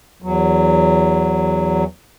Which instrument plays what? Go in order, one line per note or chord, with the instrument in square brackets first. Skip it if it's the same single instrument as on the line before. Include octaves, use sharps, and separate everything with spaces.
[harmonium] E2 F#3